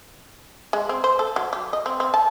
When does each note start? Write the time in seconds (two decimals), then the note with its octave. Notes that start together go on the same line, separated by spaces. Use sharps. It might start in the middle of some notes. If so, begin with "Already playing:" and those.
0.73 G#3
0.89 C4
1.04 C5
1.19 A4
1.36 F#3
1.53 G4
1.73 D#5
1.86 C4
2.00 C4
2.14 A5